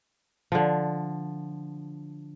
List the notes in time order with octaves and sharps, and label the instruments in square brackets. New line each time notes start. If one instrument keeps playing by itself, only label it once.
[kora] D3 F3